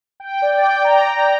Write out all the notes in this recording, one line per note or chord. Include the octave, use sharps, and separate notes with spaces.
G5
D5
G5
A#5